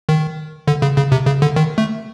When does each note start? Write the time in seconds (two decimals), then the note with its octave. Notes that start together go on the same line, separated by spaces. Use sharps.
0.09 D#3
0.68 D3
0.82 C#3
0.97 C#3
1.12 C3
1.26 C#3
1.42 D3
1.56 D#3
1.78 A3